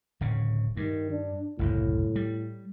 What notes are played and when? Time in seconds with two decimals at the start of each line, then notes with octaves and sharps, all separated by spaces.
0.21 D1 C#3
0.77 G2 D#3
1.11 D4
1.59 F#1 C2 F#2 A2
2.16 G3